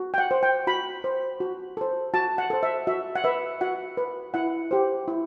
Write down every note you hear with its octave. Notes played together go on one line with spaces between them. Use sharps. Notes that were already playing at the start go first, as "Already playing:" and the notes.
Already playing: F#4
G5
F#5
C5
G5
F#4 B5
C5
F#4
A4 C5
F#4 A5
F#5
A4 C5
E5
F#4 E5
F#5
B4 E5
F#4 F#5
B4
E4 F#5
G4 C5
E4